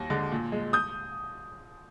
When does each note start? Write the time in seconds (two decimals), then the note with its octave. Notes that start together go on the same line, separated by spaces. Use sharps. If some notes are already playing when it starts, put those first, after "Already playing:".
Already playing: D#2 A#6
0.10 D3 G#3
0.32 A#2
0.52 G#3
0.73 D#6 G6